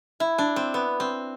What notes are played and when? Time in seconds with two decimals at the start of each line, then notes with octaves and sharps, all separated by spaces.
0.20 E4
0.38 D4
0.56 C4
0.74 B3
1.00 C4